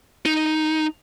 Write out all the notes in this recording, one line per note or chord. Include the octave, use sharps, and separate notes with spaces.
D#4